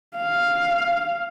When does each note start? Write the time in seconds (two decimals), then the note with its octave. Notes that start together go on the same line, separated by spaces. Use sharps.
0.17 F5